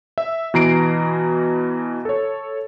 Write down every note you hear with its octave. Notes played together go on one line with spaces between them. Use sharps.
E5
B2 E3 A#5 C7 D7
A4 C#5